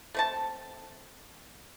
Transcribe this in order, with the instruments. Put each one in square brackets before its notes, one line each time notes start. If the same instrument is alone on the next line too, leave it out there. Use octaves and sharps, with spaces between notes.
[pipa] A3 C4 A5